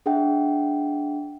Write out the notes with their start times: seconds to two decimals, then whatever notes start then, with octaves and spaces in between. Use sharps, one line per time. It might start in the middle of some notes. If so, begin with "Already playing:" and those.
0.06 D4 G#4 E5 F#5 G5